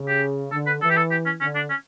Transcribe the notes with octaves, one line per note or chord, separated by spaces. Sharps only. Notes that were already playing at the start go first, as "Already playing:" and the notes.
Already playing: C#3
G4
D3 A4
B4
E3 A4
G4
A4
G4
C#4
D3 C#4
D4
C#4